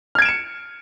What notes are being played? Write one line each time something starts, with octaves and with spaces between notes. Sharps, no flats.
F6 G#6 C#7 D7 E7